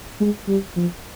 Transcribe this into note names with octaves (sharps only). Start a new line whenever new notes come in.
G#3
G3
F3